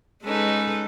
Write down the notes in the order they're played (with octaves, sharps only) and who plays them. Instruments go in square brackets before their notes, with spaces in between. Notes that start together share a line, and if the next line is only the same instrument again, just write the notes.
[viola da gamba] G#3 A4 B4 [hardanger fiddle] C#4 D#4